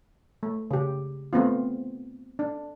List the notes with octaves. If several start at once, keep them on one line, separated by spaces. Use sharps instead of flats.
A3
C#3 G4
A3 B3 C4 F4
D4